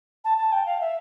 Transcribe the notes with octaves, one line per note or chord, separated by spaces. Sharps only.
A5
A5
G5
F5
E5